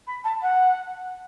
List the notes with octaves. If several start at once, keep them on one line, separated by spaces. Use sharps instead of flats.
B5
A5
F#5